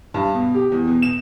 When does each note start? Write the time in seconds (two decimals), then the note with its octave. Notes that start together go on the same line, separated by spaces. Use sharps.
0.14 G2
0.34 B2
0.54 G4
0.72 E2
0.88 B2
1.02 E7